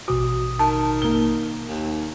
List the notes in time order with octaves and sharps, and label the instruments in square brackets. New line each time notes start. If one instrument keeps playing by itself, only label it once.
[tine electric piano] A1 B2 D#6 [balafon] F#4
[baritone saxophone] D#3 [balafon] A5
[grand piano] A#3 G7
[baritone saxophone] D#2